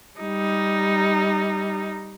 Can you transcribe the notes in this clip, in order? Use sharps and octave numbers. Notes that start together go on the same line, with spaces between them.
G3 D#4